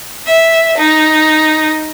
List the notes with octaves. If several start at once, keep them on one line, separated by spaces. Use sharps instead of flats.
E5
D#4